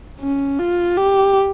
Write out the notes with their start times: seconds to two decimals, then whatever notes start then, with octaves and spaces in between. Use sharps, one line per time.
0.21 C#4
0.59 F4
0.97 G4